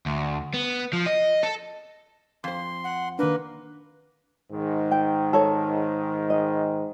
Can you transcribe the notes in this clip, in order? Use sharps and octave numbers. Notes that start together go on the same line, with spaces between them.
D2
B3
F3
D#5
A4
F2 C5 C6
F#5
D#3 A#3 D4 B4
G#2 D#3
G5
A4 C#5
D#5